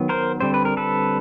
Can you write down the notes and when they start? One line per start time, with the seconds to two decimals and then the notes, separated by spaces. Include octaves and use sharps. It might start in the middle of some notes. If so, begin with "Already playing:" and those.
Already playing: D#3 F#3 B3
0.09 A#4 C5
0.40 D3 G3 C4 C5
0.54 B4
0.65 A#4
0.77 A4 B4